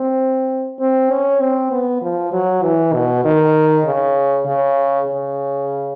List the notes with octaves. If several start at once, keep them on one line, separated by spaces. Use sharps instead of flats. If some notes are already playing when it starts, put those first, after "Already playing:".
Already playing: C4
C4
C#4
C4
B3
F3
F#3
E3
B2
D#3
C#3
C#3
C#3